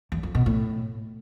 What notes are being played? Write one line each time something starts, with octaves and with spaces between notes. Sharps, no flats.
E2
F2
B2
A2